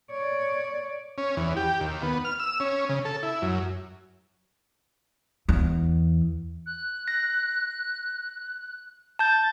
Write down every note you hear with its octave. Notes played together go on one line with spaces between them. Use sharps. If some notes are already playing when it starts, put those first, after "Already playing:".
C#5 D5
C#4
E2
G4
D#2
B3
F6
E6
C#4
C#3
A4
E4
F#2
E2
F#6
A#6
A5 G6 A6